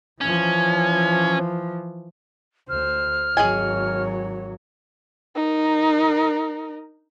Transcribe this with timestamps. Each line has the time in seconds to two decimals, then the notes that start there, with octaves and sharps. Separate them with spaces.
0.21 E3 F3 C#4
2.69 D2 C5 F6
3.37 G#1 F#3 G#4 C#5 D#5 G#5
5.35 D#4 A#4